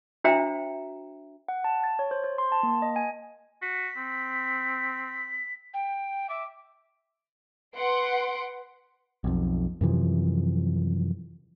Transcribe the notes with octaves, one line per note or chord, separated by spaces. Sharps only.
D4 F#4 C5 E5 G5 A#5
F#5
A5
A6
C#5
C5
C5
C6
A5
A#3
D#5
G#5
F#4 B6
C4
G5
E5 D6
B4 F#5 C6 D7
B1 F2
F#2 C3 E3 F3